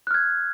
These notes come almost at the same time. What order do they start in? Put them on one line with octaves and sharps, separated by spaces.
F#6 F6 G#6